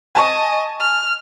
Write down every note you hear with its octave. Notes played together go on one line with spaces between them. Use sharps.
D#5 G#5 A5 C#6
F6